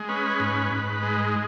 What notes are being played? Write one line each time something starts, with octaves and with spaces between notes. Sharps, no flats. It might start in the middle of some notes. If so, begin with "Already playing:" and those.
Already playing: G#3
C#4 B4
G#2
G#2
G#3